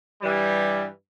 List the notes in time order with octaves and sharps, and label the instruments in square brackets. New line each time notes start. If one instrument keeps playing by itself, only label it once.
[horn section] G2 E3 G3